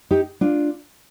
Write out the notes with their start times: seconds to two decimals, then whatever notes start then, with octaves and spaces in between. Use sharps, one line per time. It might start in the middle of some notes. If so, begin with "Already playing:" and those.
0.11 D#4 G4
0.41 D4 F4